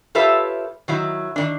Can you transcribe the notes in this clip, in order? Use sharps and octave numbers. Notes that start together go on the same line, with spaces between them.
F4 G4 A4 B4 C#5 E5
D#3 F#3 E4
D#3 E3 D4